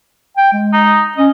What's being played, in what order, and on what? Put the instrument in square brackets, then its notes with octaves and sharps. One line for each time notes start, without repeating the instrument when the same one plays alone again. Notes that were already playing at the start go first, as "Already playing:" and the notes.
[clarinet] G5
G#3
[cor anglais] D#4
[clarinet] C#4 [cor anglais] D#5